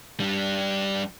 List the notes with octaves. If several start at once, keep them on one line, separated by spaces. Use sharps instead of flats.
G3 D4